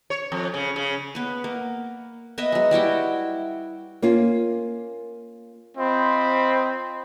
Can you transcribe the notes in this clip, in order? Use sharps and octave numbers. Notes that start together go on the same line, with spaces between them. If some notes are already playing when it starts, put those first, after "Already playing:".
C#5
F2
C#3
C#3
B3 B4
A#3
B3 B4 D#5 E5
F#3 G#3
G3 E4 F#4 G5
A#3 C#4 F4
C4 F4 C5 D#5 B5